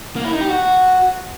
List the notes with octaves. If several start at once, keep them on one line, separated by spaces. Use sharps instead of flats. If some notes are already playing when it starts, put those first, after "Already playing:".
A#3
E4
D#4
G4
F#4